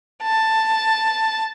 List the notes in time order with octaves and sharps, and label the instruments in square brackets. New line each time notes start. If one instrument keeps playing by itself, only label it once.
[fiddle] A5